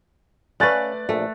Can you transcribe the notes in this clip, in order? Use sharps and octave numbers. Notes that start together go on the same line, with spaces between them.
A3 C#4 B4 D5 F5 F#6 A6
A#1 A3